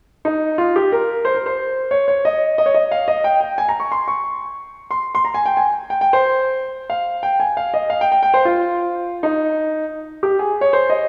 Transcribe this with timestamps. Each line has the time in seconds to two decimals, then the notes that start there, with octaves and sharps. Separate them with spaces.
0.25 D#4
0.58 F4
0.76 G4
0.92 A#4
1.25 C5
1.35 A#4
1.46 C5
1.91 C#5
2.08 C#5
2.25 D#5
2.58 D#5
2.66 C#5
2.74 D#5
2.91 F5
3.08 D#5
3.24 G5
3.41 G5
3.58 G#5
3.69 A#5
3.80 C#6
3.92 C6
4.08 C#6
4.91 C6
5.15 C6
5.25 A#5
5.34 G#5
5.46 G5
5.57 G#5
5.90 G5
6.01 G5
6.13 C5
6.90 F5
7.23 G5
7.40 G#5
7.57 F5
7.74 D#5
7.90 F5
8.01 G5
8.12 G5
8.23 G5
8.34 C5
8.45 F4
9.23 D#4
10.23 G4
10.39 G#4
10.61 C#5
10.73 C5
10.90 D#5